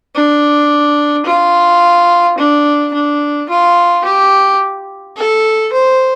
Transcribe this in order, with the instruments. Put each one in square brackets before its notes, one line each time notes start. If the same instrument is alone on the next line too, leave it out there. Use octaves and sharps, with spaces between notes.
[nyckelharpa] D4
F4
D4
D4
F4
G4
A4
C5